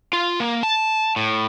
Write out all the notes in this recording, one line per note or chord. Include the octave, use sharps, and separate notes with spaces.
F4
A#3
A5
A2